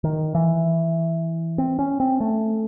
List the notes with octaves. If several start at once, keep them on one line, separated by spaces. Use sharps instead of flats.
D#3
E3
C4
C#4
C4
A3